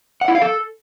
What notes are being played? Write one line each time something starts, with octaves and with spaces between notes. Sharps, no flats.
F#5
E4
F5
A4